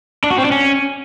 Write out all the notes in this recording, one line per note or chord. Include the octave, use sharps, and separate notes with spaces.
D4
F#4
C4
D4
C#4